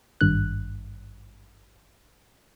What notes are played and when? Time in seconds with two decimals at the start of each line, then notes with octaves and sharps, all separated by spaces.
0.21 G#1 G2 F#6